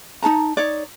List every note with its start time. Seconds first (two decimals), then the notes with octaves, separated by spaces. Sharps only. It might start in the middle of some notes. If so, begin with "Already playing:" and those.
0.23 D#4 G#4 A5 A#5
0.57 D#4 C#5 D5